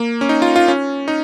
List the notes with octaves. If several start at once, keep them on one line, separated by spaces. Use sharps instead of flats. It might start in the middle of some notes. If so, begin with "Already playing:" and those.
Already playing: A#3
C#4
D#4
F4
F4
C#4
D#4